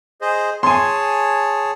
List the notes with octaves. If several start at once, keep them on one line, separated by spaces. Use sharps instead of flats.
G#4 C5 D#5
G#4 C#5 G#5 A5 C6